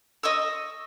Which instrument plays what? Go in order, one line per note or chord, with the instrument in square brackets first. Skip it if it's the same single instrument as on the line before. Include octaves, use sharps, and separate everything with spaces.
[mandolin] D#5 C#6 E6